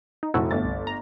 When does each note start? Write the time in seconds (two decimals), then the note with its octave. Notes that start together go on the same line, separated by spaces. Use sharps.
0.23 D#4
0.34 F1 E4 F#4 A4 C#6 E6
0.51 G1 A3 A6
0.65 C2
0.87 A#5